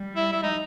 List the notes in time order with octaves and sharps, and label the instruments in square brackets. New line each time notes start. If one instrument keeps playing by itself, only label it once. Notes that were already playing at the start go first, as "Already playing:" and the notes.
Already playing: [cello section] G3
[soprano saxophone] E4
E4
D#4